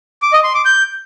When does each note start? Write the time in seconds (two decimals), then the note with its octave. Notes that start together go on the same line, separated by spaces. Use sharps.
0.22 D6
0.33 D#5
0.44 C6
0.55 D6
0.65 G6